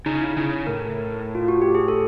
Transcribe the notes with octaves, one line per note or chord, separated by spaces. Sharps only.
C#3 D#4
E4
C#3
A2 A#4
F4
F#4
G4
G#4
A4